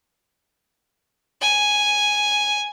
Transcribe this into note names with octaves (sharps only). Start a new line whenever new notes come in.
G#5